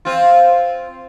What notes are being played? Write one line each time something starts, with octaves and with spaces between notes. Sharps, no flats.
C4 F4